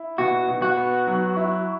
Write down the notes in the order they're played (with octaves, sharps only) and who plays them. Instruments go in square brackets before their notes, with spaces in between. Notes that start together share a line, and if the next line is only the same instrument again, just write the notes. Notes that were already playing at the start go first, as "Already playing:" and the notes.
Already playing: [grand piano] E4
[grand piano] B2 [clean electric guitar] F#4
[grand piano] B2
[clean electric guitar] F#4
[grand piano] B3
F#3
E4